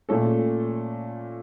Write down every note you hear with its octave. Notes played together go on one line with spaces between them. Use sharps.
A#2 A3 C#4 A4